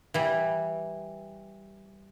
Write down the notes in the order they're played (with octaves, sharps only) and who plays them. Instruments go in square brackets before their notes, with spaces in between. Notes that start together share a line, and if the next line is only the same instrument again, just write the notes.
[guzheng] E3 G3